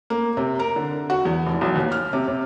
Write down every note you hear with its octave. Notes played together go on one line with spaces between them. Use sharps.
A#3
C3
A#4
D3
F#4
E2
F1
B1
D#2
F6
C3
C3